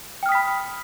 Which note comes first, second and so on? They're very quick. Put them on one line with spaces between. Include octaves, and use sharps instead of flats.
G5 F6 D#6 B6 B5